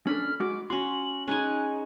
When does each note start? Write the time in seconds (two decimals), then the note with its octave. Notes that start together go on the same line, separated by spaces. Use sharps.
0.07 C#4 D4 A4 B5 F6
0.40 G#3 F#4 D6
0.70 C#4 F#4 C6 F#7
1.28 G#3 C#4 D#4 G#5 F#6